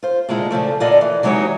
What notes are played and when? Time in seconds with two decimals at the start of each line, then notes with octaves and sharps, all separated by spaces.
0.03 F4 C5
0.29 A#2 D3 G#3 E4
0.51 A#2 C#3 F3 A3
0.80 A#2 D3 F4 D5 D#5
1.01 E3
1.23 E3 F#3 G#3 D#4 G4 C#5